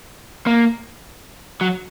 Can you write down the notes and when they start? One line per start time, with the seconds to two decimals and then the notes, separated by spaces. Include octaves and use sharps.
0.47 A#3
1.61 F#3